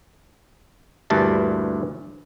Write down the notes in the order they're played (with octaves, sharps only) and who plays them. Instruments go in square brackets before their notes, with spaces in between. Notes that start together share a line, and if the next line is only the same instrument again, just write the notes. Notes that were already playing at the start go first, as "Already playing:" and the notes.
[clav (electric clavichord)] D2 G2 A#2 E3 A5